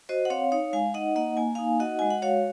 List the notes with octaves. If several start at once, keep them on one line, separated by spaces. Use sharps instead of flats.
F#4 C5 D#5
F#5
C4 C#5 F5
D#4 C#5 F5
G#3 F5 G#5
D#4 D#5 F#5
A#3 D#5 F#5
A#3 G#5
D#4 F5 G#5
F#4 D#5 F#5
G#3 G#5
F#5
F#4 C#5 F5